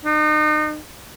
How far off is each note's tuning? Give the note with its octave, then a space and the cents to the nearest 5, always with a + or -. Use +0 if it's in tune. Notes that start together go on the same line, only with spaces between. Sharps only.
D#4 -35